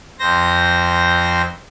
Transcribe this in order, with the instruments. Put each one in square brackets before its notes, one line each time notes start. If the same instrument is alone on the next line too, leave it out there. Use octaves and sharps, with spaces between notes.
[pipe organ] F2 C5 A#6